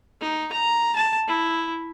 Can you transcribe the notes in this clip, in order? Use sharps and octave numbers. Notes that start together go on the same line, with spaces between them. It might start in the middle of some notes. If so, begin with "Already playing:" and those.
D#4
A#5
A5
E4